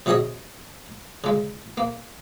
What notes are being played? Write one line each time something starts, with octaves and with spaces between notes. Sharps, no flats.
C3 F#3 G#4 C#5 D#5 D#6
C#3 G#3
A#3